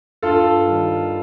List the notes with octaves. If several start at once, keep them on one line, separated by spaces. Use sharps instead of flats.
G2 F4 A4
D#3 G3